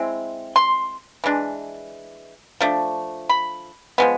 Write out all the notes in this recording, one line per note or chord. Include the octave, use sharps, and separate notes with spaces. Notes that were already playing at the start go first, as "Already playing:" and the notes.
Already playing: G#3 C4 E4
C6
E3 G#3 D4
F3 A3 D4
B5
F3 G#3 B3